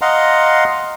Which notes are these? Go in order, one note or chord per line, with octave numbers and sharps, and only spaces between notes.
D#5 F5 F#5 A#5 C6